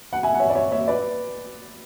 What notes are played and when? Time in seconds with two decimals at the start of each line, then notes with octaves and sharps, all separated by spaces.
0.13 F#5
0.23 E5 G#5
0.34 F#5
0.39 C#5 E5
0.50 D5
0.55 C#5 E5
0.71 C#5 E5
0.88 B4 D5